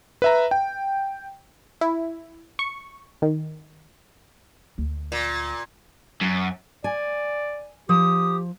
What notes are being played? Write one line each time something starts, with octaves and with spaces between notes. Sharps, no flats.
B4 E5 A#5
G5
E4
C#6
D#3
D2
A#2
F#2
D5 G#5
F3 G4 D#6